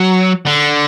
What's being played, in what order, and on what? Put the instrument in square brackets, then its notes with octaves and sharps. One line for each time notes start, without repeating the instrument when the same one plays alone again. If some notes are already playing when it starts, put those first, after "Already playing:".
Already playing: [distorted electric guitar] F#3
D3